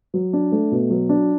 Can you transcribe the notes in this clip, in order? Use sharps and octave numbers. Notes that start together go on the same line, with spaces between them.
F#3
D4
A3
B2
F#3
D4